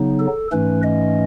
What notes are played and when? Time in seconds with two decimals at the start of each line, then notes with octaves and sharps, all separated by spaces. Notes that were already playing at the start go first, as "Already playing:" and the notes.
Already playing: C#3 F#3 B3 D#4
0.20 A4
0.52 G#2 E3 A3 C#4 B4
0.83 D#5